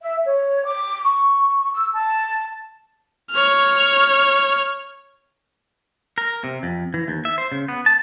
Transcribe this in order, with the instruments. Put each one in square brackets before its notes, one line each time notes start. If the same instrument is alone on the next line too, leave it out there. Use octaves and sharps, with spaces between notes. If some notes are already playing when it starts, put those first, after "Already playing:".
[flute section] E5
C#5
D6
C#6
E6
A5
[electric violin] C#5 F6
[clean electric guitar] A#4
C3
F2
E3
D#2
E5
C5
C#3
B3
A5